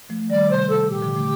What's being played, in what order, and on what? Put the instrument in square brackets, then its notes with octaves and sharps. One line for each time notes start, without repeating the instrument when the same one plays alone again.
[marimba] F3 A3
A3
[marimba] D#3 G3 [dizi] D5
[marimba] C3 [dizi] C5
[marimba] C3 [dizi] A4
[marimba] A#2 [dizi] G4
[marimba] D3 F3
F3 A3